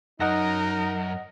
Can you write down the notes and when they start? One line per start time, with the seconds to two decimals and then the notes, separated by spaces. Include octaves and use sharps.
0.20 F#2 D#4 A#4 D#5 F#5 A#6